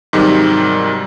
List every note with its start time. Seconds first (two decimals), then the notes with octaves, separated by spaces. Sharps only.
0.13 G#2 C3 D#3 F#3 G3